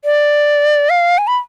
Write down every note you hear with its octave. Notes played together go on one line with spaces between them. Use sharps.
D5
F5
G#5
B5